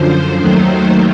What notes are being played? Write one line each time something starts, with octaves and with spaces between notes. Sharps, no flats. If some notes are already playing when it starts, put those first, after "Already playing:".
Already playing: F#2 D3 F3 C5
D#2 D#3 F#3 A3 C5